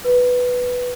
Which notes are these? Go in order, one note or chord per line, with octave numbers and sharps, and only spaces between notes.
B4